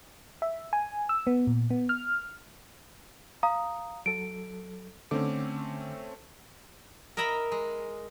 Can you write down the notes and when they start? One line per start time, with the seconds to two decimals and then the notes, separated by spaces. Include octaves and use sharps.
0.42 E5
0.73 G#5
1.09 E6
1.27 B3
1.47 A#2
1.70 B3
1.89 F6
3.43 F5 A#5 D#6
4.06 F#3 A4 D7
5.11 D3 A3 C4 C#4 D6
7.17 A#4 D#5 E5 A#5 B5
7.52 G#3